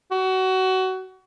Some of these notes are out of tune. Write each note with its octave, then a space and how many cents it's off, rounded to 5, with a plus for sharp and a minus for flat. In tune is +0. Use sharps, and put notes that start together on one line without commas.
F#4 +25